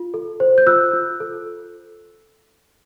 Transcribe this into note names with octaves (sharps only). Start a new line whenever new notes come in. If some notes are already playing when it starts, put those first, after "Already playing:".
Already playing: F4
A4
C5
G6
F4 E6 F#6
F4
A4